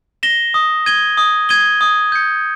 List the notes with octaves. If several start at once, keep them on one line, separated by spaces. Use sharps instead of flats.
A#6 E7 G7
D#6
G#6 D#7 G7
D#6
G#6 D#7 G7
D#6
G6 C#7